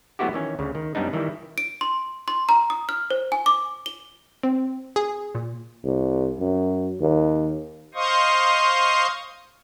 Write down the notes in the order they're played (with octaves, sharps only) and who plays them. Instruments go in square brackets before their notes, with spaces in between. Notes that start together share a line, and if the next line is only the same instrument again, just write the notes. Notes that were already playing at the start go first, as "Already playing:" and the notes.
[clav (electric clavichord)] F#3 A3 B3 E4 F#4 G4
D#3 E3 C#4
D2 C#3
D#3
F#2 F#3 G3 B3 D4 D#4
D#3 E3 G3 E4
[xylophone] D7
C6
C6
A#5
D#6
F6
C5
G#5
D6
G7
[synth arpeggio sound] C4
G#4
A#2
[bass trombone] C2
F#2
D#2
[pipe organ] C5 D#5 F5 C6 C#6 D#6